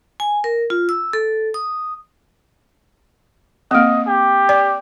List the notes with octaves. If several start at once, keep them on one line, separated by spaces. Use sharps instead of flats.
G#5
A#4
F4
E6
A4
D#6
A#3 C4 D#5
G4
D5